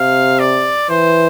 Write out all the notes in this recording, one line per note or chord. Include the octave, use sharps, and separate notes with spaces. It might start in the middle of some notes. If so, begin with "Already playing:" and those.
Already playing: C3 F5
D5
E3 C5